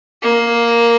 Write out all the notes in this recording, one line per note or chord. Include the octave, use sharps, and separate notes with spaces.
A#3